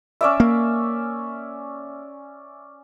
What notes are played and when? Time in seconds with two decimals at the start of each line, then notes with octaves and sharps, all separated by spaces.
0.21 C#4 D5 E5
0.40 A#3